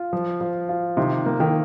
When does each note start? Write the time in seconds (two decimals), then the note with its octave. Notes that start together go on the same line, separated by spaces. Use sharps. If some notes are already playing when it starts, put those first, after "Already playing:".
Already playing: F4
0.13 F3
0.41 F3
0.69 F4
0.97 C3 D#3
1.26 A#3
1.40 D#3